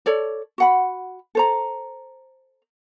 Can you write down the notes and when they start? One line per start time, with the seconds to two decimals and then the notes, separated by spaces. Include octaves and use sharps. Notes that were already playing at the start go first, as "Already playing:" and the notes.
0.06 A4 C#5 D5
0.58 F#4 F#5 B5
1.35 A4 C5 A#5